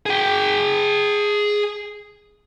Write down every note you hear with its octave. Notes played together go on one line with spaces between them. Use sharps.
G#4 G5